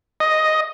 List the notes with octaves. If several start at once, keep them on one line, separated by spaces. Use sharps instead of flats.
D#5